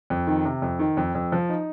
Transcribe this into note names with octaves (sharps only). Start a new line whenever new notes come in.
F2
D#3
C3
F2
D#3
F2
F2
F3
D#4